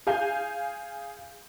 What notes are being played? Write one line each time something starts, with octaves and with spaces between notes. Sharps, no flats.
G#4 F5 G#5 G6